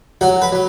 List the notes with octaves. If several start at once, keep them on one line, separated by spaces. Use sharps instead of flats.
F#3 F#4
B4
F#3